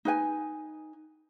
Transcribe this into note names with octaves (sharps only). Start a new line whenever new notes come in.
D#4 B4 G#5